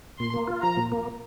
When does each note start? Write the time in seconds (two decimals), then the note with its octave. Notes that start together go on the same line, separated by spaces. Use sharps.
0.19 A#2 C6
0.34 A#3
0.48 F4
0.62 F3 A#5
0.77 A#2
0.92 A#3